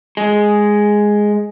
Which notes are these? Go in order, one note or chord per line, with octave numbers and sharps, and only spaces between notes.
G#3